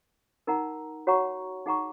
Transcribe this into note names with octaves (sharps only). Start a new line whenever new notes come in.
D#4 A#4 F#5 A#5
F#4 C#5 F#5 A#5 C#6
D#4 G#4 F#5 A#5 C#6